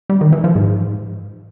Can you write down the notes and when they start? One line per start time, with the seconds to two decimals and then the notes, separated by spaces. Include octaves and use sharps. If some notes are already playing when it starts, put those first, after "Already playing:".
0.09 G3
0.21 D#3
0.32 E3
0.44 F3
0.55 G#2